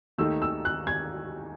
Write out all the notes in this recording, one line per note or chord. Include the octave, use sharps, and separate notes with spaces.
D#2 D#3 A3 D#4 E6
E6
F#6
G#6